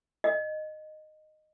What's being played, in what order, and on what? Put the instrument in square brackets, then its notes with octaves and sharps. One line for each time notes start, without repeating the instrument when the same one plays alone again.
[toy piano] D#5